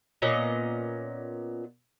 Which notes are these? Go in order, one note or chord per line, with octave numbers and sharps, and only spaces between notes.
A#2 B3 C#4 D#5